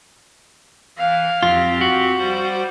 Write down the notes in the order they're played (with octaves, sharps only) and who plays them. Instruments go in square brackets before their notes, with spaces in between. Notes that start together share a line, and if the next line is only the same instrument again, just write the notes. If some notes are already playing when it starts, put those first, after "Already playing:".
[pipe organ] E3 [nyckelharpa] F5
[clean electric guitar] F2 F4 [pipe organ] C4 G4
[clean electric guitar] F#4
[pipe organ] G3 C5 [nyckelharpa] D6